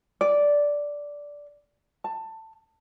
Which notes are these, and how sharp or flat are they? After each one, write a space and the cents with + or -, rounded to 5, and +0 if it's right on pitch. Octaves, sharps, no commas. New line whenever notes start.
D5 -10
A5 +15